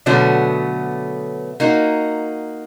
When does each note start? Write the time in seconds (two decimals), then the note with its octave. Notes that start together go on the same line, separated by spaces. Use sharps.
0.06 B2 D3 F#3 A3 B3 F#4
1.60 A#3 D#4 F#4